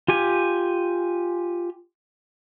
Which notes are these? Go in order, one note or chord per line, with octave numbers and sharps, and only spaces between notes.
F4 G4 G#5